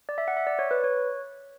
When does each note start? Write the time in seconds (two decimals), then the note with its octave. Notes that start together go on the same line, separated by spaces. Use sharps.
0.09 D5
0.18 E5
0.28 F#5
0.37 E5
0.47 D5
0.59 C#5
0.71 B4
0.84 C#5